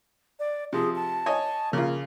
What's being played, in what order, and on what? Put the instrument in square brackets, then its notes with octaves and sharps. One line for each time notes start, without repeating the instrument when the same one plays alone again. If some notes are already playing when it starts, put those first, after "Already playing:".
[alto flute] D5
[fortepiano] C3 F3 [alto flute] G#4
[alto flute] A5
[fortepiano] C#5 D#5 G#5
[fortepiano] C#3 F4 [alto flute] A#3